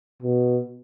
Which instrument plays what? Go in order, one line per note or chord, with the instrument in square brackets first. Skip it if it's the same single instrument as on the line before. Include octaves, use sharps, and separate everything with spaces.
[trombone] B2